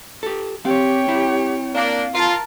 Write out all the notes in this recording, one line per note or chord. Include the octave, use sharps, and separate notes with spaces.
G4 A4
C4 G4 C#5 F5 G5
C4 E4
A#3 D4 F5
F4 A#4 A5